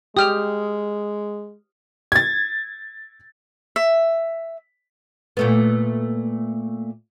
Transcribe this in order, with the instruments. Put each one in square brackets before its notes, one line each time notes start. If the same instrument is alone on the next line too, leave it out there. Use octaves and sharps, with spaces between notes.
[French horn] G#3 [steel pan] G4 G5 [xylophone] D#6 F6 F7
[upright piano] G#6 A6
[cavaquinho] E5
[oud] A#2 A3 B3